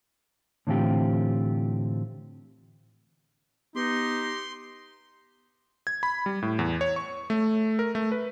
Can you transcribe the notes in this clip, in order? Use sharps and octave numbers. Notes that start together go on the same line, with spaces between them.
A2 D3 E3 C4 F4 G4
B3 D#4 G4 C6
G#6
B5
G3
A2
E2
C#5
C#6
A3
A#4
A3
B4